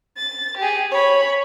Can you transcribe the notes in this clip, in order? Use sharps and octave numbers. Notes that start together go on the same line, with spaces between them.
A6
G4 G#4
C#5 B5